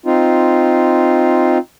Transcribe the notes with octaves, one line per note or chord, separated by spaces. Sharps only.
C4 D#4 F4